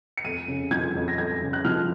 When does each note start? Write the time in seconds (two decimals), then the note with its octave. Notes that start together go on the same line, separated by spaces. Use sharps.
0.17 C#7
0.24 F2 D#7
0.48 C#3
0.71 F3 G#6
0.95 F2
1.08 A#6
1.18 F2 G#6
1.41 C#3
1.53 F#6
1.65 F3 F6